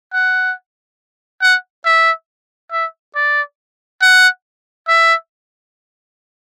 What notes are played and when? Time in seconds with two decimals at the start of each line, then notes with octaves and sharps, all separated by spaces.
0.14 F#5
1.42 F#5
1.85 E5
2.72 E5
3.15 D5
4.02 F#5
4.88 E5